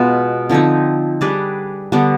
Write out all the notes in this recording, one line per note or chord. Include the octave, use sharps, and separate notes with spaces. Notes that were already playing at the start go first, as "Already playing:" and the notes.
Already playing: B2 G#3 B3 F4
D3 F3 C4 D#4
G3 D4 G#4 B4
D3 G3 B3 D4